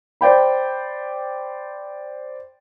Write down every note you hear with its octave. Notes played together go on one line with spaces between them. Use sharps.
C5 D5 G5 B5